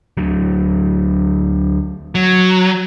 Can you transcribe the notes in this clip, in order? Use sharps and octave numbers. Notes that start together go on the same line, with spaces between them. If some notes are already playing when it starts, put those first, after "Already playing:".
D2 F#3
F#3